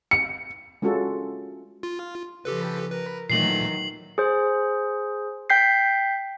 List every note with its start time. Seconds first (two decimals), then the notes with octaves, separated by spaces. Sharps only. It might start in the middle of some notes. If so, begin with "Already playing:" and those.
0.11 C#7
0.82 G#3 C#4 F4 F#4 A4
1.83 F4
2.45 C#3 F3 G4 A4 B4
2.91 A#4 B4
3.30 A#2 D#3 E3 F#3 A3 C7 F#7
4.18 G#4 C5
5.50 G5 G6 B6 C7